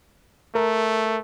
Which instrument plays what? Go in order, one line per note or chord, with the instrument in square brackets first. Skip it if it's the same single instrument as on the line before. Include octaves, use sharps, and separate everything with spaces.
[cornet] A3 [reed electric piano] A#4